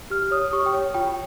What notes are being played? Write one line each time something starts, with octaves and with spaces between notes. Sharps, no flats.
G4 F6
C#5 D#6
G4 C#6
G5
C#5
F4 G5